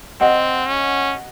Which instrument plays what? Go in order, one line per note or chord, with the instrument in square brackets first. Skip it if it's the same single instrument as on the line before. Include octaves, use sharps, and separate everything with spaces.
[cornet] C4 [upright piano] D#5 F#5
[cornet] C#4